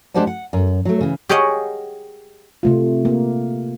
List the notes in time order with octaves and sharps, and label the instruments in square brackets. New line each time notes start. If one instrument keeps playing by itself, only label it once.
[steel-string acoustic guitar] G#3 D4 G4 C5 F#5 A5
F#5
F#2
F#3 A3
C#3 E3
[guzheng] G4 G#4 A#4 C#5 D#5 F#5
[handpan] C3 A3 F4
A#3